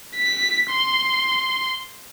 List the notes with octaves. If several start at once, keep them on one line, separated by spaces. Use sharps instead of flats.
B6
C6